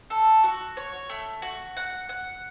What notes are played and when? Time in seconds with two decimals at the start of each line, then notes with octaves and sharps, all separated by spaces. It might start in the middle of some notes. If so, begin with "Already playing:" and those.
0.10 A4
0.44 F#4
0.77 C#5
1.09 A3
1.42 F#4
1.77 F#5
2.09 F#5